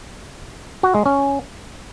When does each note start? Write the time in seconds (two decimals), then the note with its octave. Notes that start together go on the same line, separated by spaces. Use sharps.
0.83 F#4
0.94 G#3
1.06 C#4